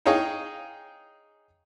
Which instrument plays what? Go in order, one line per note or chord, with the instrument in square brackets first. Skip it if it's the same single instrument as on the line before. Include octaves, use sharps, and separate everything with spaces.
[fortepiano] D#4 G#4 C#5 D#5 F5 G5